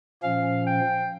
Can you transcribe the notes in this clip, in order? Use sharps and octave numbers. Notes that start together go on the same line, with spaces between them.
A#2 F3 C#4 F5
G5